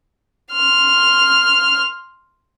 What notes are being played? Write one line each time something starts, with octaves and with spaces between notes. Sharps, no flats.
C6 F6